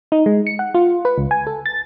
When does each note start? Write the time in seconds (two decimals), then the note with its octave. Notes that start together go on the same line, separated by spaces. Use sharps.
0.12 D#4
0.26 G#3
0.47 C#7
0.59 F#5
0.74 F4
1.05 B4
1.18 C#2
1.31 G#5
1.47 A4
1.66 A6